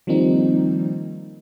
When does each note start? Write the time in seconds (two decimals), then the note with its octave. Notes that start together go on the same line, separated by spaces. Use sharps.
0.07 D#3 F3 G3 A#3 C4 D#4